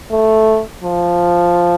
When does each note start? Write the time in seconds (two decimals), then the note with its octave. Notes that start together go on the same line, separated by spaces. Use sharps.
0.11 A3
0.83 F3